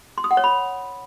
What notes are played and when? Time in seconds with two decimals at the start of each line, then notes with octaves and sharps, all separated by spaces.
0.18 C6
0.24 D#6
0.31 F#5
0.37 C#5
0.44 B5